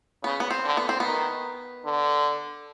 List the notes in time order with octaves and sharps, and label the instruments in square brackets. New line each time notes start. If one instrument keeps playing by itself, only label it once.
[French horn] C#3 [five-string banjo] B3
[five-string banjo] B3
C4
[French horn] D3
[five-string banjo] B3
C4
[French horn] D#3 [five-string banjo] B3
[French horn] D3